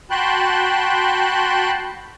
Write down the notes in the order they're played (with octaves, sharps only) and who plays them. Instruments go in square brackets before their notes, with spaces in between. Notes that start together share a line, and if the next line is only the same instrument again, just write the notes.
[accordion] F#4 G5 A5 B5 C6 F#6